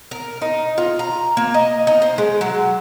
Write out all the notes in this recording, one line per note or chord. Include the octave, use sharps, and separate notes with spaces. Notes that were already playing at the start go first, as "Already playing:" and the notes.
A#4
D#4
F4
A#5
A#3
D#5
D#4
C5
G#3
F#3